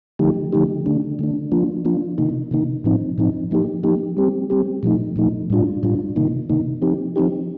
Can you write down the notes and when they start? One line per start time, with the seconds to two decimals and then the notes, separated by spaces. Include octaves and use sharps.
0.19 D3 F3 A3 D#4 G4
0.53 D3 F3 A3 D#4 G4
0.86 D3 A3 D4
1.19 D3 A3 D4
1.52 F3 A#3 D4 F4
1.85 F3 A#3 D4 F4
2.18 C3 D#3 A#3 D#4
2.51 C3 D#3 A#3 D#4
2.84 A2 F3 C4 D#4
3.18 A2 F3 C4 D#4
3.51 F3 A#3 D#4 G4
3.83 F3 A#3 D#4 G4
4.17 G3 C4 G4
4.50 G3 C4 G4
4.83 A#2 F3 A3 D#4
5.16 A#2 F3 A3 D#4
5.50 A2 G3 D4 F4
5.83 A2 G3 D4 F4
6.16 C3 D#3 A#3 D#4
6.50 C3 D#3 A#3 D#4
6.82 F3 C4 D#4 G4
7.16 F3 C4 D#4 G4